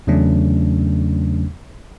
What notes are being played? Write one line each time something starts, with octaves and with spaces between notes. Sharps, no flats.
E2 C#3 F#3 A3 C#4 D4